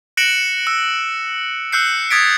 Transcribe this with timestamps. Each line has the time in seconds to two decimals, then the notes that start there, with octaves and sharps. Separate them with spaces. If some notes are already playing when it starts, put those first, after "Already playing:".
0.17 F#6 A#6 C#7 D7 E7 F#7
0.67 E6
1.72 E6 F#6 G6 C7 C#7
2.11 D#6 G#6 A6 B6 D7